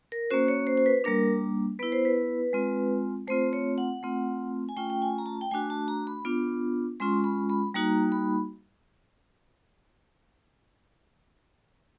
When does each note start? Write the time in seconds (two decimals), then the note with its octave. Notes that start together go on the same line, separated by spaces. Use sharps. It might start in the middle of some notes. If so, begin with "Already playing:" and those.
0.12 A#4
0.30 A#3 C#4 F#4 C5
0.48 C#5
0.67 C5
0.78 C5
0.86 B4
1.04 G3 A#3 D4 A#4
1.79 B3 E4 B4
1.92 C5
2.05 B4
2.53 G#3 C4 F4
3.27 A3 C4 F4 C5
3.53 C#5
3.78 F#5
4.03 A3 C4 F4
4.69 G#5
4.76 A3 C#4 F4 G5
4.90 G5
5.02 G#5
5.18 A#5
5.26 A5
5.41 G5
5.51 A3 D4 F#4 G#5
5.70 A5
5.88 A#5
6.07 B5
6.25 B3 D4 F4
7.00 G#3 C#4 F4 C6
7.24 B5
7.50 B5
7.74 G3 A#3 D#4 F#4 A#5
8.12 B5